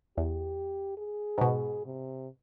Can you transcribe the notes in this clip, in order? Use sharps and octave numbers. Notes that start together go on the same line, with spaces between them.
E2 G4
G#4
G#2 B2
C3